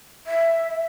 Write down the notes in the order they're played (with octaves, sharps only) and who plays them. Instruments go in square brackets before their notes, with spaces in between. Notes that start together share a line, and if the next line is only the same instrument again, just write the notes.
[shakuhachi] E5